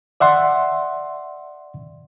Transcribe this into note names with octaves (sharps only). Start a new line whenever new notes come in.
D5 E5 F#5 C6